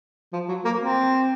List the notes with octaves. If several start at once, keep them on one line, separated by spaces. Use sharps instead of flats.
F3
F#3
A#3
C4